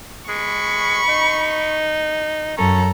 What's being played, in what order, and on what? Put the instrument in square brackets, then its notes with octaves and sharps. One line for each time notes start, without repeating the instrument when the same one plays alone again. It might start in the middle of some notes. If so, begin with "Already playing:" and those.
[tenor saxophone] G#3 [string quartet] B5 C#6
[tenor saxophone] D#4
[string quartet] F#2 A4 A#5 [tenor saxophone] C#4